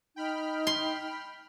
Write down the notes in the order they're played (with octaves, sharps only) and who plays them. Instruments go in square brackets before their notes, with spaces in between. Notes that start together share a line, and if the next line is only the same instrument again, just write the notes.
[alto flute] D#4 [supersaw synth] G5 B5 F6
[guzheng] C6